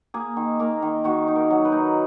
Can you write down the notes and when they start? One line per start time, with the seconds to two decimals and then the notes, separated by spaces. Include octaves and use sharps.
0.14 A#3 G#4
0.37 D#3
0.59 A#3 A#4
0.82 D#3
1.04 D#3 F#4
1.28 D#4
1.36 A#4
1.50 F#3
1.65 B4
1.72 D#4